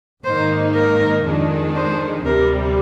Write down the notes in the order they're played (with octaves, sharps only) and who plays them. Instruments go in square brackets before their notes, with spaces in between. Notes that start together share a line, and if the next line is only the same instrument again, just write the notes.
[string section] G#2 D#3 A#3 D#4 [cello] C5
[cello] A#4
[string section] F2 D#3 G#3 D4
[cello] C5
[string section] D2 C3 G3 [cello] A#4